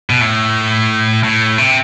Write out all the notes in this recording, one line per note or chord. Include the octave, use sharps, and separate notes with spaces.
B2
A2
A2
C3